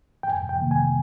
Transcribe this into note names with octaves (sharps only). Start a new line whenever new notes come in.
G5
F2 G#5
G5
C3 D#3 A#3
G#5